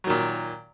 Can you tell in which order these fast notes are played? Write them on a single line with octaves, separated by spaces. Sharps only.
F#3 D#3 A#2